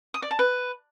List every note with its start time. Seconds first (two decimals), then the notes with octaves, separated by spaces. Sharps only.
0.14 D#6
0.22 D5
0.31 A5
0.39 B4